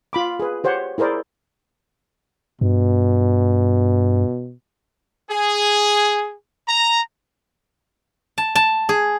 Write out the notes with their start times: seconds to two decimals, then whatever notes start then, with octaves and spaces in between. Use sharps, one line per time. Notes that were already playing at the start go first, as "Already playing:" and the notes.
0.13 F4 B5 D6
0.40 G#4 B4
0.64 G4 C5 C#5 F#5
0.98 E4 G#4 A#4 C5 D5
2.61 G2 B2
5.29 G#4
6.67 A#5
8.38 A5
8.55 A5
8.89 G#4